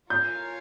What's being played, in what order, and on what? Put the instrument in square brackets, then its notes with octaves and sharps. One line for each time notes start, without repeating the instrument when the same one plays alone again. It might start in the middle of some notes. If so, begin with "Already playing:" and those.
[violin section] F4 A#4 C#5 F5 G#5 [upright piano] G6